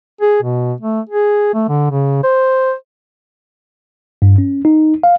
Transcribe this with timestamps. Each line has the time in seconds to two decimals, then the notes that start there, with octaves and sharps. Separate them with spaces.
0.21 G#4
0.42 B2
0.81 A3
1.09 G#4
1.54 A3
1.69 D3
1.91 C#3
2.24 C5
4.22 G2
4.38 C#4
4.65 D#4
5.03 F5